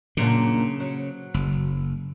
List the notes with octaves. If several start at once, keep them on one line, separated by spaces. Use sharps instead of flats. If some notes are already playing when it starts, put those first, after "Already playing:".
F#2 A#2 C#3 D4
F#3
F#1